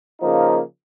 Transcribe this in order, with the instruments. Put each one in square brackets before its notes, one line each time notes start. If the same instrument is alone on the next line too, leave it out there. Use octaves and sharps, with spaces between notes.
[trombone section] C#3 F3 A#3 D#4